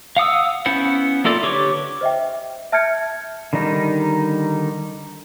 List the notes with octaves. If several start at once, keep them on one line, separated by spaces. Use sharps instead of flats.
F5 F#5 D#6 E6
B3 C#4 E4 C5 F#5
A#3 E4 F4 A4 D5
D3 G4 B4 C#5 D6
C5 D#5 E5 G5
E5 A5 F6 G6 G#6 C#7
D3 D#3 G3 D#4